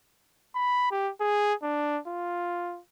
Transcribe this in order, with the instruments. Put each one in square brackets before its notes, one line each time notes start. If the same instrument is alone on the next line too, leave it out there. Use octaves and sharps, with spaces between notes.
[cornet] B5
G4
G#4
D4
F4